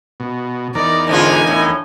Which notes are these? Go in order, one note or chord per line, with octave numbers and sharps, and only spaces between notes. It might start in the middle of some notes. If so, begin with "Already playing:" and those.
B2
E2 D#4 A#4 D5
G#2 D3 F4 G#5
A2